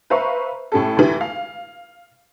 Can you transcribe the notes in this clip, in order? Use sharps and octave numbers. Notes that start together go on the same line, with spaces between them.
B4 C5 E5 F5 A#5 C#6
A2 C#4 G4 A4
D2 E3 G4
F5